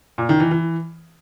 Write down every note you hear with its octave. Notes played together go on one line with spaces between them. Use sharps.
A#2
D#3
E3
E3